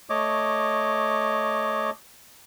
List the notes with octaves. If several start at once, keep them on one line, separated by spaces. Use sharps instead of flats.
A3 C#5 D#5 D6